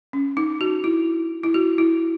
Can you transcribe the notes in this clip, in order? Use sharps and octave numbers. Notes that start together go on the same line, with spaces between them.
C#4
D#4
F#4
E4
E4
F#4
E4